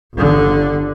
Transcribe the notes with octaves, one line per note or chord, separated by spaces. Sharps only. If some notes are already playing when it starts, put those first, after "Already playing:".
G1 D3